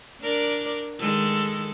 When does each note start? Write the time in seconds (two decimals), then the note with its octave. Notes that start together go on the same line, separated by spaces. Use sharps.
0.21 D4 A#4 D5
0.99 D#3 G#3 A4